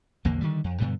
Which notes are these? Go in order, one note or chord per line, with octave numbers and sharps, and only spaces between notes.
A#1 E2 D3 A#3
D3 D#3 F#3 G3
F2
G2 B2 D3 G3